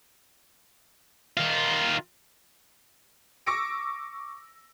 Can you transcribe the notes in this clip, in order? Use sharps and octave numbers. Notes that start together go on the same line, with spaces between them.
D#3 F4
C#6 D6 E6 A#6 C#7 D7